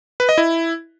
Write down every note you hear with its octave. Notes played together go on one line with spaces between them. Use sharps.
B4
D#5
E4